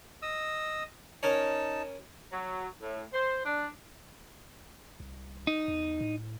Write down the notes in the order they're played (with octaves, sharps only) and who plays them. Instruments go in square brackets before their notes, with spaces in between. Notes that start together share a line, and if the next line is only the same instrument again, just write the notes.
[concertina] D#5 D#6 E6
[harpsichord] C#4 A#4 C#5 [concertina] D#4 A5
[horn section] F#3
A2
C5
D4
[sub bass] C2
[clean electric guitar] D#4
[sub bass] E2
A2